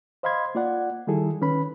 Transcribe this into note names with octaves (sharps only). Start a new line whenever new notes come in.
C5 D#5 F5 B5 C6 G#6
A#3 F4 D5 F#5
D#3 G3 E4 G#4 A4
D#3 C#4 B4 B5